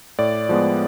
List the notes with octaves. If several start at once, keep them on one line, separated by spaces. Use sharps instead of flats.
A2 D5
F3 G#3 B3